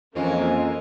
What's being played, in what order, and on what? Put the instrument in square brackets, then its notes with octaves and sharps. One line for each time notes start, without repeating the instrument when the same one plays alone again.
[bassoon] F2 [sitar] E3 G#3 F4 [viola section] A#3 [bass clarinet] C#4